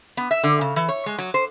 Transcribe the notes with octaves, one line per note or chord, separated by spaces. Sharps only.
B3
E5
D3
C#3
E3
C#5
G#3
F#3
C5